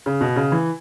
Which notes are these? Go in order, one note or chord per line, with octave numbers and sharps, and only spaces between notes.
C#3
B2
C#3
E3